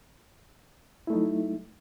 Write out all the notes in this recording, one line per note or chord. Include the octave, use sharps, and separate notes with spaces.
F#3 A3 D#4 E4